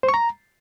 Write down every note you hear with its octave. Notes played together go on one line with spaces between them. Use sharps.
C5
C#6
A#5